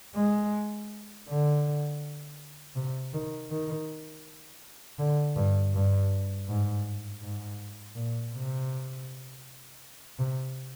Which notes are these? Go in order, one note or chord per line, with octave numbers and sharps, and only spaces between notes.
G#3
D3
C3
D#3
D#3
D3
G2
G2
G#2
G#2
A#2
C3
C3